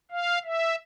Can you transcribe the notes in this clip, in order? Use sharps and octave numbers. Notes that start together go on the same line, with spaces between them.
F5
E5